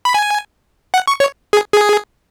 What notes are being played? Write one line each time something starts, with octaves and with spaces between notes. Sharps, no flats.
B5
G#5
F#5
C#6
C#5
G#4
G#4